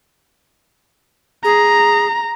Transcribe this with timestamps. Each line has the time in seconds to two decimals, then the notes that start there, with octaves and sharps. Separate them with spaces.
1.44 G#4 A#5